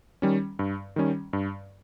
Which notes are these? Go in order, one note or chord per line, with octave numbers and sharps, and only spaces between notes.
D#3 G3 C#4
G2
D#3 G3 C#4
G2